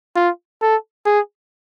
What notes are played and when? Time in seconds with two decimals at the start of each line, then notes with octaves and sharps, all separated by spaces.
0.16 F4
0.62 A4
1.06 G#4